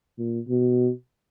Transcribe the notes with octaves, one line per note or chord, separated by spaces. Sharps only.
A#2
B2